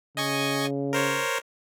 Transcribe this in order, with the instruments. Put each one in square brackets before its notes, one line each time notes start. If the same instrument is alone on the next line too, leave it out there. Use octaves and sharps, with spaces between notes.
[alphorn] C#3 [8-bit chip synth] D#5 G#5 C#6
[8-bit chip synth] A#4 C5 C#5